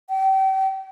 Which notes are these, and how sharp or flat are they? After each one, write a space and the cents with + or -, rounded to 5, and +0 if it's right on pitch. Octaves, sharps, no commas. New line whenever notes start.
G5 -35